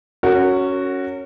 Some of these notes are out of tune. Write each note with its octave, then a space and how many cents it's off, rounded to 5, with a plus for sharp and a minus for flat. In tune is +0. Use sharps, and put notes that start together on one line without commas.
C#4 +0 F#4 +0 A#4 -35